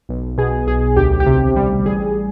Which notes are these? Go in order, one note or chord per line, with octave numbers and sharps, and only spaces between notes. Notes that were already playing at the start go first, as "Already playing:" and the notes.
B1
B2 G#4
B1 G#4
D2 G4
G4
C3
G3
A1 G#4